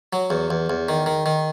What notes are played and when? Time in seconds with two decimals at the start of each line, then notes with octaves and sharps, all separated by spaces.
0.13 F#3
0.30 E2
0.50 E2
0.70 E2
0.89 D#3
1.06 D#3
1.26 D#3